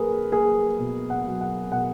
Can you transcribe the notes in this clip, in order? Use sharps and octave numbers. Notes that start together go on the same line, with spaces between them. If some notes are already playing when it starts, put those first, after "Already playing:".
Already playing: F#3 A#3 G#4 A#4 B4
A#3 G#4
B2
F#5
F#3
F#5
B2 F#5